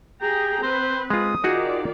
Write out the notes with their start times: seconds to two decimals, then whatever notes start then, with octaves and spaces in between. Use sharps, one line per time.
0.22 G4 G#4 G5 A#5
0.63 C4 B4 C5
1.10 G#3 F4 D#6
1.44 D#3 D#4 F4 F#4 G#4 D5